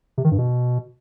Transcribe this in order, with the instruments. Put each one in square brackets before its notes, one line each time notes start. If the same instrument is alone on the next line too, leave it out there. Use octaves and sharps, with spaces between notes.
[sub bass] C3
D#3
G2
B2